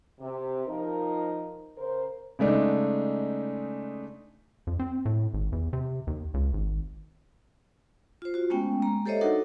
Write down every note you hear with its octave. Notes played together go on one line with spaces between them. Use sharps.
C3
F3 D#4 A#4
C#3 A#4 C5
C#3 G#3 A3 D4 D#4
F2
C4
A2
G#1
E2
C3
D#2
C#2
G#1
F4 C5
F4 F#4
G#3 A3 B3 C#4 G5
G#3 A#3 A#5
G4 A4 C5 C#5 D#5 E5
D4 D#4 F#4 A4 A#4 F#5